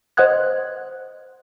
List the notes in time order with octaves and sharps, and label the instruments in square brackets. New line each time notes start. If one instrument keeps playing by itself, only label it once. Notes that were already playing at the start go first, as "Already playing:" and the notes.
[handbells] C5 D#5 F#5 D#6 F#6 G#6